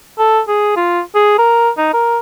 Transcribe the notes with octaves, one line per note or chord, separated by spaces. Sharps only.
A4
G#4
F4
G#4
A#4
D#4
A#4